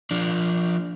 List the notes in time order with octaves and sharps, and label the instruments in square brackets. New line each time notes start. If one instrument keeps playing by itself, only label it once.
[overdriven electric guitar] F3 D4